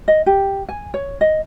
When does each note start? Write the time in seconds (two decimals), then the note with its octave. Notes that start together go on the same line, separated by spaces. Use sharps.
0.08 D#5
0.26 G4
0.69 G#5
0.94 C#5
1.21 D#5